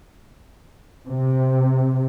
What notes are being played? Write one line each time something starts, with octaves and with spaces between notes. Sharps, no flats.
C3